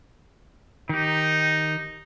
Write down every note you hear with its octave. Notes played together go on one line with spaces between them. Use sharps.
D#3 D#4 G4